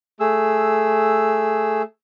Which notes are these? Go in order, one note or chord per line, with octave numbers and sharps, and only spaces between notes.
A3 G#4 E6